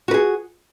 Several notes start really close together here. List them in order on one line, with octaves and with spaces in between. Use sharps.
F#4 B4 G#4